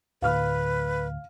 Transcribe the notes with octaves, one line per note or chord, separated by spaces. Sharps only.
D2 A2 D3 B4 F5 F6